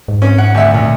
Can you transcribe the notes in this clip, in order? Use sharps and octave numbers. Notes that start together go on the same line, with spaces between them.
G#2
C#4
F#5
D2 E5
D2 A#2